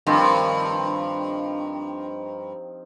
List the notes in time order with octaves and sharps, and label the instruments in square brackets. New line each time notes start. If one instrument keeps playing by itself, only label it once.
[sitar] G2 [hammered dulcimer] D#3 F3 C4